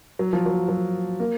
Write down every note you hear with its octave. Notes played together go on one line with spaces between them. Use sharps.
F#3
F3
F#3
F#3
A#3